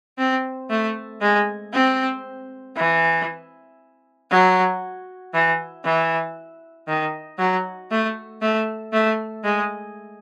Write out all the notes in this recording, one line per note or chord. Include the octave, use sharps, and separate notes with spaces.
C4
A3
G#3
C4
E3
F#3
E3
E3
D#3
F#3
A3
A3
A3
G#3